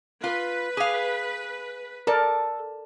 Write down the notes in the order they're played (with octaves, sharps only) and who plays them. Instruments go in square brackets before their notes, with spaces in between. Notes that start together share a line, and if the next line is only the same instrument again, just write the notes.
[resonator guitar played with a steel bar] F4 [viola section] B4
[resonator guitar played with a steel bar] G#4 F5
[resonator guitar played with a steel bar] A4 [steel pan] A#4 D5